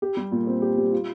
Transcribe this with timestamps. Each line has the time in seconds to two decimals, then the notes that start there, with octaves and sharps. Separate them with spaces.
0.02 G4
0.17 G3
0.32 A#2
0.47 C4
0.62 G4
0.78 G3
0.92 F4